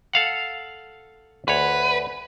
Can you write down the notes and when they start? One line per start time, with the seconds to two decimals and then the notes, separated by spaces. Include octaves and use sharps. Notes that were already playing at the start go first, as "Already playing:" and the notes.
0.13 A4 F5 F#5
1.48 D2 B4 C#5